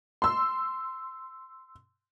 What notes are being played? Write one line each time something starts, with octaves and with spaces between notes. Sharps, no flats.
C6 E6